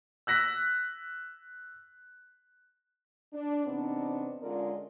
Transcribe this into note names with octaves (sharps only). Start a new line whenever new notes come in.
E6 F#6 A#6 B6
D4
E2 C3 B3 C4 D4 D#4
D3 G#3 C#4 F4 A#4 D5